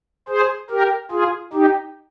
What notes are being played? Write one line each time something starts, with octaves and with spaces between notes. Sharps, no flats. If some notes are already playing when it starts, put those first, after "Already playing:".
G#4 C5
G4 A#4
F4 G#4
D#4 G4